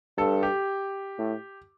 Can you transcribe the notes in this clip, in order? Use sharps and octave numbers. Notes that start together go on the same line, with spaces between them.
G2 A4
G4
A2